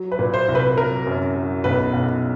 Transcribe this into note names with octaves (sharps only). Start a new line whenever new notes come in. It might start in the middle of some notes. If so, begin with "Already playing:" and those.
Already playing: F#3
B4
A#2
C5
C2
B4
F#3 A#4
F#2
F#3
B1 B4
B1